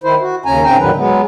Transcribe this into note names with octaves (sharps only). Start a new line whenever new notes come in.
D#3 E4 C5
F#4
D#2 C#3 C#4 G#5 A#5
G#2 C#3 C4 G5 A#5
E2 A2 D3 D#3 F#3 B4
F#3 G#3 B3